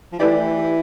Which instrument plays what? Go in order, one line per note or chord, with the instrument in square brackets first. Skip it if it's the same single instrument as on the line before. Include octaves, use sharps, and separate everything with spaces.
[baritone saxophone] F3
[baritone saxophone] E3 [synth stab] A3 E4 G4 B4 D5